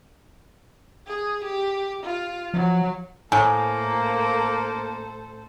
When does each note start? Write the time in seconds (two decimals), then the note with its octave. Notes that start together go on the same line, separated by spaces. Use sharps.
1.07 G#4
1.45 G4
2.03 F4
2.54 F3 F#3
3.32 A2 A#3 A4 C5 G#5